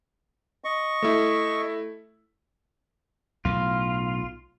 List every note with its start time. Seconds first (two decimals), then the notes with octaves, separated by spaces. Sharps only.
0.64 D#5 C#6
1.02 A3 E4
3.45 B1 A2 F4